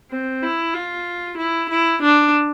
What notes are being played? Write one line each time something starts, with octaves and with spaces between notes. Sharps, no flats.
C4
E4
F4
E4
E4
D4